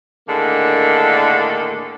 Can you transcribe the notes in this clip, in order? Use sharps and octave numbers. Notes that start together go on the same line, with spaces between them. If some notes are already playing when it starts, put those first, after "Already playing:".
A2 D3 D#3 A#3 D4 G#4